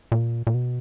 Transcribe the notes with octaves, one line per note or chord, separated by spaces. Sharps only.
A#2
A#2
B2